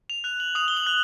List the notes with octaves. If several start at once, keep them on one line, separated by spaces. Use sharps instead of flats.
F7
F#6 F7
F#7
D#6 F7
G7
F#7
F#6